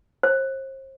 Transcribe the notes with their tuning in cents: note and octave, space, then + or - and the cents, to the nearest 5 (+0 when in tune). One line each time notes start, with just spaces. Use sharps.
C5 +35